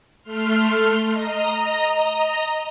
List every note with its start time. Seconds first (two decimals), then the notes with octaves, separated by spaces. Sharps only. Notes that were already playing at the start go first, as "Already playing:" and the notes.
0.23 A3 C6 F6
1.12 D#5 A#5